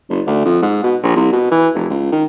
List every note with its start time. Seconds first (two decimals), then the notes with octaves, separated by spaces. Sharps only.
0.10 F#1
0.27 D2
0.45 F2
0.62 G#2
0.83 B2
1.03 A#1
1.16 C2
1.33 B2
1.51 E3
1.74 F1
1.90 C#2
2.12 D#3